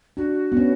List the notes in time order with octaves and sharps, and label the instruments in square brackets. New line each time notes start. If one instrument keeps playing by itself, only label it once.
[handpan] D4 [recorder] F#4
[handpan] B3
C#4